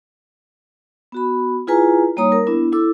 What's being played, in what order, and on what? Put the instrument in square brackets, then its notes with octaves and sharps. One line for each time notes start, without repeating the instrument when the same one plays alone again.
[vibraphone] B3 F#4 B5
E4 F4 G#4 B4 G#5 A#5
G3 A#3 D#4 C#5 A#5 D#6
A#4
B3 D4 E4
E4 A4 D6 E6